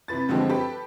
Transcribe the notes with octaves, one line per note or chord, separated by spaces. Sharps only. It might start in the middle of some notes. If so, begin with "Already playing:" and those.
C3 E3 B4 A6
G2 D3 F3 G#3 C4 G4
G4 A4 B4 G5